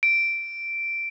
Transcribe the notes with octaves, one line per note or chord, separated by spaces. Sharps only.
D7